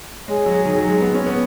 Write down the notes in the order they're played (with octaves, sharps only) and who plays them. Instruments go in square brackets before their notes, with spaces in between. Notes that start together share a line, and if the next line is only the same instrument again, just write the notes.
[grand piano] G#3 [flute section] G#4 C#5 G#5
[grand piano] F#3
D#3
F#3
G#3
B3
C#4
B3